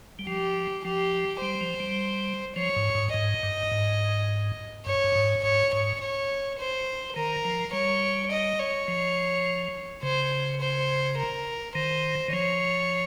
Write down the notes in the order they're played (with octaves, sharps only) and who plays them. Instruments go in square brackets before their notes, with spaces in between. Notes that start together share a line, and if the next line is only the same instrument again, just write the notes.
[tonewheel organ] G3
[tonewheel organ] F3 [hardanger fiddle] G4
[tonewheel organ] F3 [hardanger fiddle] G4
[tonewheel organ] G3 [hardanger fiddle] C5
[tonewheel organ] F3
G3
[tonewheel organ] F3 [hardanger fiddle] C#5
[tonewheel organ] G#2
G#2
[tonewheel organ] G#2 [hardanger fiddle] D#5
[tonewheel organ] G2
G#2
[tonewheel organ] G2 [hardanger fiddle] C#5
[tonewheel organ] G2
G#2
[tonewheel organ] G#2 [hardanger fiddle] C#5
[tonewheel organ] G#2 [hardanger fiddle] C#5
[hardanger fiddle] C#5
C5
[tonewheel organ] D#3 [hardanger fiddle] A#4
[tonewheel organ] F3
[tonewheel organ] G3 [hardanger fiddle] C#5
[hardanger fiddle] D#5
C#5
[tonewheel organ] F3
[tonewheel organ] C#3 [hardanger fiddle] C5
[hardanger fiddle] C5
A#4
[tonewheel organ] D#3 [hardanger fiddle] C5
[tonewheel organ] D#3
[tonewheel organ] F3 [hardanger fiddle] C#5